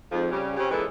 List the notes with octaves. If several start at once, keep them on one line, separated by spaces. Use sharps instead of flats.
F2 G#2 F3
C#3 G3
C#3 C4 G4
A#2 E3 G#3 B3 A4 A#4